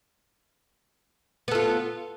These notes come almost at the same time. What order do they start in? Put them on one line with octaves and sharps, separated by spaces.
B3 A4 F4